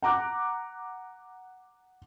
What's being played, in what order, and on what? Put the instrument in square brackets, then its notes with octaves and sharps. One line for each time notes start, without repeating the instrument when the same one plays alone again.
[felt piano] F#5 A#5 D6 F#6